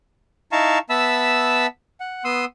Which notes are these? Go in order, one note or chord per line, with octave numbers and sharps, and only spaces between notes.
D#4 E4 F5 A5 A#5 C#6
B3 E5 A5 B5 E6
F#5
B3 C6 D#6 E6